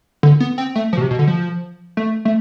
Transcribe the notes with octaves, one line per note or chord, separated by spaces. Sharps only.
D3
B3
C4
A3
F3
B2
C3
B2
D3
F3
A3
A3